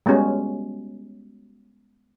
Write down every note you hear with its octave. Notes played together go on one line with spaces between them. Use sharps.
G3 G#3 B3 C#4 F#4